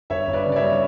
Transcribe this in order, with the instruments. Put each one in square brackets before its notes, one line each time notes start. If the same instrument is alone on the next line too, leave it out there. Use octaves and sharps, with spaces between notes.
[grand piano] G1 C#5 E5
G1
B4 D5
C#3
D5
C#5 E5
G3